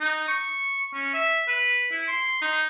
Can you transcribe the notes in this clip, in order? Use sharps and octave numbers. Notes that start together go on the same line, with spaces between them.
D#4
C#6
C#4
E5
B4
E4
C6
D#4